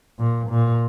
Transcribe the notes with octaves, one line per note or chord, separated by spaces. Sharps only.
A#2
A#2